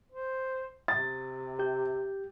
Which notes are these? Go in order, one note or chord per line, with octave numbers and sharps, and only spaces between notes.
C5
C3 A6
G4 G6